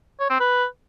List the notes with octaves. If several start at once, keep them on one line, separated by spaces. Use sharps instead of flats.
C#5
C4
B4